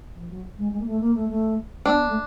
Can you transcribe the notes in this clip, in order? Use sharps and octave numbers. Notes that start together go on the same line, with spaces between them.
F3
F#3
G#3
G#3
A#3
A3
A#3
A3
A3
B3 D4
A3